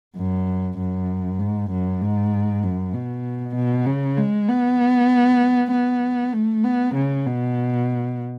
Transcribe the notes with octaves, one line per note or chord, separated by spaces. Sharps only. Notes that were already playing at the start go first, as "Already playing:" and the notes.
F#2
F#2
G#2
F#2
G#2
F#2
B2
B2
C#3
G#3
B3
B3
A3
B3
C#3
B2